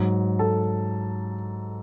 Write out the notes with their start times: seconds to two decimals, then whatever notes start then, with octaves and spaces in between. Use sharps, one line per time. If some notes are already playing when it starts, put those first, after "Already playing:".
Already playing: G#2 F#3
0.39 A4